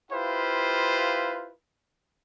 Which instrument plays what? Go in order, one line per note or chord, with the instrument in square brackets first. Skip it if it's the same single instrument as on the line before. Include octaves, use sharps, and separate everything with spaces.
[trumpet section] E4 F4 G4 B4 C5 F5